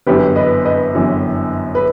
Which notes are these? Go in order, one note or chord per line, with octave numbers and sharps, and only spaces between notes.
G1 F#2 E3 G4 B4
B4 D#5
B4 D#5
G1 F#2 E3
B4